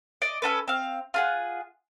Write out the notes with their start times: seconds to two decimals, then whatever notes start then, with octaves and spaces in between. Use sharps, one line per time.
0.22 D5 D#5
0.42 C#4 F#4 A4 B4
0.68 C4 F5
1.14 F4 G#4 F#5